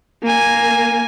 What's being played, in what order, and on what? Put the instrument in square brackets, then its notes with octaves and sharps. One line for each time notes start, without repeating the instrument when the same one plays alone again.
[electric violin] A#3 G#5